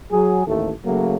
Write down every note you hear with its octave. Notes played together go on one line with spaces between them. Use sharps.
F#3 G#4
A1 D#2 A3 A4
C#3 F#3 A3 A#3